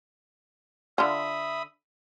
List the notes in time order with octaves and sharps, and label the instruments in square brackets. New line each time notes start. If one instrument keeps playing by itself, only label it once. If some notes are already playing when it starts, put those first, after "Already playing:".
[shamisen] D3 F4 [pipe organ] E5 B5 D#6